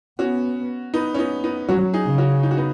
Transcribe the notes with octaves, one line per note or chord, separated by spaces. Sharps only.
B3 C#4 F#4
B3 D#4
C#4
B3 D#4
B3 D#4
F#3 C#4 F#4
D#4 G#4
C#3
C#4 F#4
D#4
F#4
B3 D#4